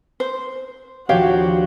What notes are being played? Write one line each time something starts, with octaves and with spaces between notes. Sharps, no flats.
C5
D#1 F3 D4 F#4 G4 C#5 F5